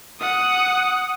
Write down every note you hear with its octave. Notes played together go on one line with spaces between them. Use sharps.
F#5 D#6